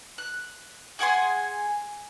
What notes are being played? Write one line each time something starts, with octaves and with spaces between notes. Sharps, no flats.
F#6
G#4 F#5 G#5 C6